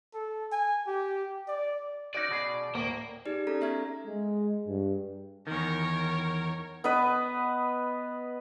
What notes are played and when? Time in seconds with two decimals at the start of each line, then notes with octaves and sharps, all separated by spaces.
0.14 A4
0.52 G#5
0.87 G4
1.48 D5
2.15 C#4 D#4 F#4 D5
2.31 B2 G#4
2.75 D2 A2 A#3
3.25 D#4 G4 G#4 D5
3.47 C#4 A4 A#5
3.61 B3 E5 F6 G#6
4.07 G#3
4.67 G2
5.47 E2 D#3 A#4 C#5
6.84 B3 B4 D#5